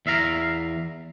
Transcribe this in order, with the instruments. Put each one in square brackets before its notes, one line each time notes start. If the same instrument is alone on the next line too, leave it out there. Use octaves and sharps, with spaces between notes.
[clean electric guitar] E2 E5 F5 A#5